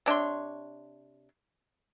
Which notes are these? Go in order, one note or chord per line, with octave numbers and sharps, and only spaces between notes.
C3 D4 C#5 C6